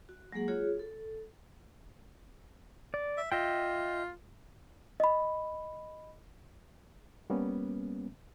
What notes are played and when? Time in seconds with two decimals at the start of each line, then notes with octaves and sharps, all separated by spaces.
0.09 F#4
0.32 F#3 G#3 A#3 G#4 F#5
0.48 F4 F#4 G#4 C#5
0.79 A4
2.94 D5
3.18 E5
3.32 F4 D#5 E5 G5
5.00 D#5 B5
7.30 G3 A#3 B3 C#4